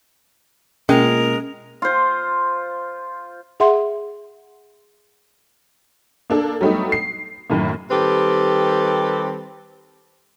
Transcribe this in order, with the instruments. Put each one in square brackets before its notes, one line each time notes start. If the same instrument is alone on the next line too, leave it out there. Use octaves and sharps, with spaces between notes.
[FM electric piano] B2 A#3 F4 [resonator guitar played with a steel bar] G#3 [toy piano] C#4 [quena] A#4
[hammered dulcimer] F4 C5
[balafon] G#4 E5 F#5 C6
[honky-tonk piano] A#3 D4 A4
F#3 G3 A3 B3 D#4
C7
F#2 A2 D#3 A#3
[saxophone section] D#3 G3 C4 G4 A4 B4